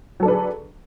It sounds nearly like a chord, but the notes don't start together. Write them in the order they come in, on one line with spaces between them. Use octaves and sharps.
F#3 A4 D4 B4 G#4